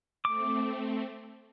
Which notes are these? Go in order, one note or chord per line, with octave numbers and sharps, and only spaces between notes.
A3 C4 D6